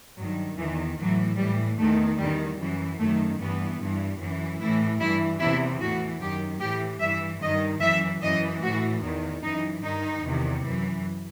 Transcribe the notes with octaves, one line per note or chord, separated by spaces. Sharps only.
G2 D#3 F#3
E2 D#3 E3
A2 E3 F#3
A2 E3 G3
E2 D#3 A3
E2 D#3 G3
F#2 E3
F#2 D#3 A3
G2 E3 B3
G2 E3
F#2 E3
A2 E3 E4
G2 E3 E4
E2 C3 E3 E4
A2 E3 F#4
F#2 D#3 G4
A2 E3 G4
G2 E3 E5
G2 D#3 D#5
F#2 E3 E5
F#2 E3 D#5
A2 E3 F#4
E2 D#3
F#2 E3 D#4
G2 D#3 D#4
E2 C3 D#3
F#2 E3